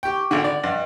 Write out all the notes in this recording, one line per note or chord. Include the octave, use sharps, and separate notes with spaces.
G4 G5 C#6 D6
G#1 D3 F#5
D5
G2 D#5